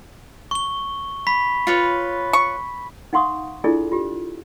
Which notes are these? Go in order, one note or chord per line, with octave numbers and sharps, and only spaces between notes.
C#6 G7
B5 B6
F4 B4 C#5
C#6
D#4 F5 F#5 C6 C#6 D#6
D4 E4 F4 G#4 A4 D5
F4 G4